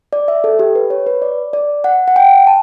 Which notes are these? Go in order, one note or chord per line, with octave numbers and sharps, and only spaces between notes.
D5
E5
A4
G4
B4
C#5
B4
D5
D5
F#5
F#5
G5
A5